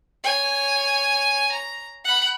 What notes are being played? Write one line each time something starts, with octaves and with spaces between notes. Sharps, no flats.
C#5 G#5
A#5
F#5 B5